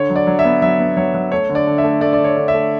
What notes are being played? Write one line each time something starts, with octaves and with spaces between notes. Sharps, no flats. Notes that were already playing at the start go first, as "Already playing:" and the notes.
Already playing: D3 C#5
F#3
D5
F#3
E5
B3
F#3 E5
B3
F#3 C#5
F#3
A3 C#5
D3
D5
D3
E5
A3
A3 D5
D5
D3
C#5
D3
E5
A3